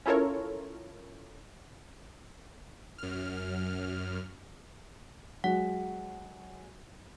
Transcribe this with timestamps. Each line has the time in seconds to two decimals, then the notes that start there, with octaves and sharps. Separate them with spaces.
0.06 C#4 E4 F4 A4 A#4 C#5
2.98 F#2 F6
5.44 F#3 G#3 F#4 F#5